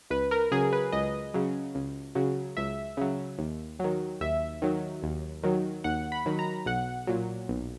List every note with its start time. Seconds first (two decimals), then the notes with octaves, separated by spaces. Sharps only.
0.10 C#2 B4
0.31 A#4
0.51 C#3 F#3 G#4
0.73 B4
0.92 C#2 D#5
1.34 C#3 F#3
1.75 C#2
2.15 C#3 F#3
2.57 C#2 E5
2.97 C#3 F#3
3.38 D#2
3.79 D#3 F#3
4.21 D#2 E5
4.62 D#3 F#3
5.03 D#2
5.43 D#3 F#3
5.84 D#2 F#5
6.12 B5
6.26 D#3 F#3
6.39 A#5
6.66 B1 F#5
7.07 A#2 F#3
7.48 B1